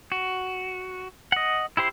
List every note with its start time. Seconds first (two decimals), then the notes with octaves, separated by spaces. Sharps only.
0.12 F#4
1.32 D#5 F#5
1.77 E4 G4 C5 C6